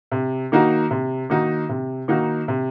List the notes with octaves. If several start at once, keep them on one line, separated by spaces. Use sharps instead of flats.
C3
D#3 A#3 D#4 F#4
C3
D#3 A#3 D#4 F#4
C3
D#3 A#3 D#4 F#4
C3